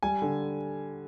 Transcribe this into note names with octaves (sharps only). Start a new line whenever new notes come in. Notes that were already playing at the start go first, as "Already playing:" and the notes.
G3 G#5
D3